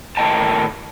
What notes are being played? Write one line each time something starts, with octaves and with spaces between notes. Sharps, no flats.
A2 D#3 A#3 D#5 G5 A5